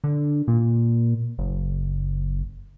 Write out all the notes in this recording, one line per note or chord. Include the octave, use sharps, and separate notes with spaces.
D3
A#2
F#1